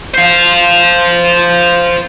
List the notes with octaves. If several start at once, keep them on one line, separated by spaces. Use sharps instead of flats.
C5 F5